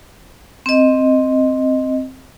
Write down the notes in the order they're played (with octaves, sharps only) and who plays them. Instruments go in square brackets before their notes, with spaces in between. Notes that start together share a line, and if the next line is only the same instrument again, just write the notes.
[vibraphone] C4 D#5